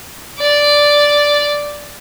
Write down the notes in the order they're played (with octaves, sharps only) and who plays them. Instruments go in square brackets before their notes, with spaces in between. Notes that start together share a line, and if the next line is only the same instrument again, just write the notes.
[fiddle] D5